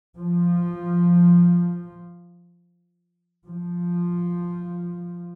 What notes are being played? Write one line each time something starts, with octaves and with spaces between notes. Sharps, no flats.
F3
F3